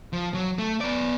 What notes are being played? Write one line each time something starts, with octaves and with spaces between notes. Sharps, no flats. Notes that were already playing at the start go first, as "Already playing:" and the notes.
F3
F#3
A3
B3 D5